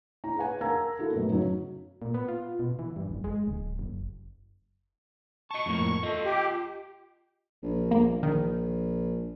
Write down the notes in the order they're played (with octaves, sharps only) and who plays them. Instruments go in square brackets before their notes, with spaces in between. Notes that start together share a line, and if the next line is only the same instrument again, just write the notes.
[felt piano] E4 A#5
G#4 B4 F#5 G#5
A#4 F5 A5 A#5 E6 G#6
A#3 E4 F#4 A4
F#2 A2 B3
C#3 F#3 D#4
[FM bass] A#2
B3
F4
B2
E3
G2
F#1
G#3
D1
F#1
[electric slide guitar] D#5 A5 [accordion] C#6
[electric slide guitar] F2 A2 A#3
[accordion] A3 [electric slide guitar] F4 D#5
[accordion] G4
[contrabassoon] A#1
[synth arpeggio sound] A#3
[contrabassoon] A#1 [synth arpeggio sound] D#3